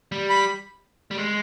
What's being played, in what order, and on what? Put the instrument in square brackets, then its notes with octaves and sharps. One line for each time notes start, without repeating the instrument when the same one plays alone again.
[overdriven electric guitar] G3
[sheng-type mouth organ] B5
[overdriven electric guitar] G3
G#3